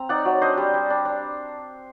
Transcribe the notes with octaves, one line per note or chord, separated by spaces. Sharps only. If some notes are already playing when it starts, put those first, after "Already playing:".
Already playing: C4 A#5
D#4 D5 F#5
F#3
D4 C5 D#5
G3
G3
D4
D4